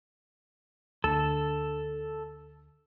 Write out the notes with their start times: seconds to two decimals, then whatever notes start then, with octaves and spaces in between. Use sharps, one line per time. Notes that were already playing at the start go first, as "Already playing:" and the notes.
1.04 D2 A4